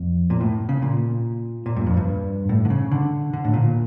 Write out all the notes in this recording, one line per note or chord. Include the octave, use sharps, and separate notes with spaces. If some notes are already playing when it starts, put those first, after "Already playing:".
Already playing: F2
A#2
A2
C#3
A#2
A#2
G2
F2
G2
A2
D3
C#3
D3
D3
A2
A#2